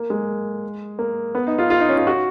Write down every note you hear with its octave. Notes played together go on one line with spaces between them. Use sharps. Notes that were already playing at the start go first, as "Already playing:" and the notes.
Already playing: A#3
G#3
A#3
B3
D#4
F4
F4
D#4
C#4
F4
F#4